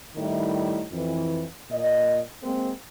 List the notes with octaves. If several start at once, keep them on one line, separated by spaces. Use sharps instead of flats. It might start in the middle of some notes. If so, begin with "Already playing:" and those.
A2 D#3 G3 D#4 E4
F2 E3
A#2 D#5
G#3 A#3 C4